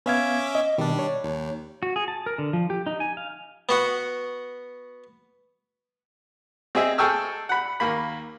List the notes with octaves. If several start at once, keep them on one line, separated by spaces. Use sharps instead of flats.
B3 C#4 E5 F5 D6 G#6
D#5
B2 D#3 G3 D4
C#5
D#2
F#4
G#4
A5
A#4
D3
F3
G4
D#4
G#5
F5
B3 F#4 F#5
C4 G#4 D#5 E5
G#4 A4 G5 C#6 E6 F6
F#5 B5
D#2 A#3 B5